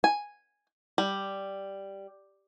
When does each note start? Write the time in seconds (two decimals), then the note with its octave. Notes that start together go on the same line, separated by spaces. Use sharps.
0.04 G#5
0.98 G3